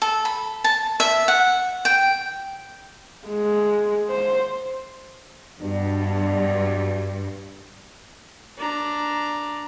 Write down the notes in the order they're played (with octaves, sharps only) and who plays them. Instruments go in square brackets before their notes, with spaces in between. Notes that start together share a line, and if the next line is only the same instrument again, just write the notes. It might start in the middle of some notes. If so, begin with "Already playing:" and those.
[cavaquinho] A4
B5
A5
E5
F#5
G5
[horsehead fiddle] G#3
C5
[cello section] G2 [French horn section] B2 D4
[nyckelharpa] D4 A#5